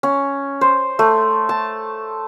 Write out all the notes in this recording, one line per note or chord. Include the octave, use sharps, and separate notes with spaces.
C#4
C5
A3
A5